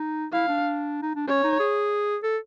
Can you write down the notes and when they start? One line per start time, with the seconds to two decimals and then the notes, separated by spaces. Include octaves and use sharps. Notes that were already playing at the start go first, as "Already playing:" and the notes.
Already playing: D#4
0.32 E4 F5
0.48 D4
1.03 D#4
1.15 D4
1.28 C#4 C#5
1.44 D#4
1.60 G#4
2.23 A4